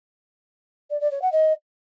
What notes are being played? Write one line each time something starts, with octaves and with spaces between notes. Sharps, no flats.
D5
D5
C#5
F#5
D#5